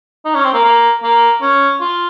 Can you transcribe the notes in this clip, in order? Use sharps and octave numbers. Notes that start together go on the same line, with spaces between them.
D#4
C#4
C4
A#3
A#3
A#3
C#4
F4